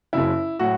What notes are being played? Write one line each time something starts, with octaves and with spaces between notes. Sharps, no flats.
F#1 F#2 C#3 E4
A2 F#3 F#4